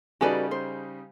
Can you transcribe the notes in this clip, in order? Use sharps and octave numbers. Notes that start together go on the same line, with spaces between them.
C#3 G3 D#4 F#4 G#4 A4 B4 D5
C5